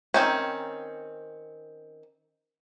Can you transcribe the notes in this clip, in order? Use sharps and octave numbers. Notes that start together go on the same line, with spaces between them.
D#3 C4 C#4